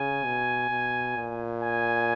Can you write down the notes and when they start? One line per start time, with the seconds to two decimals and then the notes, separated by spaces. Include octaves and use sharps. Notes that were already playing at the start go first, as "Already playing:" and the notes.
Already playing: C#3 G#5
0.24 B2
0.70 B2
1.17 A#2
1.63 G#5